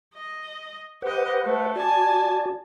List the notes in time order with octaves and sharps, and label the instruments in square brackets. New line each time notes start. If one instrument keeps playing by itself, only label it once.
[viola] D#5
[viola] G4 D#5 [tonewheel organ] B4 C5 F#5
[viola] A3
[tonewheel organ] F#4 D5 [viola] G#5 A5